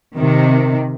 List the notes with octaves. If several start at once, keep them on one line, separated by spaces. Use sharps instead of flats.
C3 D#3